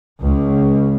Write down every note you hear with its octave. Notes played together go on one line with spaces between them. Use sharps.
C#2